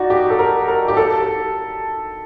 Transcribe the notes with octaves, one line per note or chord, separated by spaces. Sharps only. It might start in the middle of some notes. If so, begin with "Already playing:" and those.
Already playing: D#4 F#4 D5
G4
A4
A#4
A#4
G4
A4